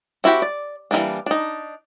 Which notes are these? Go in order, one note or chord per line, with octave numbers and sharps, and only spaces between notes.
C4 E4 F#4 G4
D5
E3 F3 G3 A#3 D4
D4 D#4